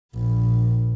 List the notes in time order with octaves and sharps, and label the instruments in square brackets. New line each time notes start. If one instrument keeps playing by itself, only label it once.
[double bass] A#1